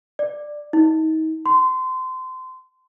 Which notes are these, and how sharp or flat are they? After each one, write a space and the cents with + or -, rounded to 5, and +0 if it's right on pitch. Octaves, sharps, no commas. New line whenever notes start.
D5 +10
D#4 +30
C6 -25